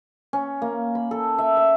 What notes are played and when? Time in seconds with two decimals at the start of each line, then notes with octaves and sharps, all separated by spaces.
0.33 C#4
0.62 A#3
0.95 B5
1.11 A4
1.38 E5
1.57 E5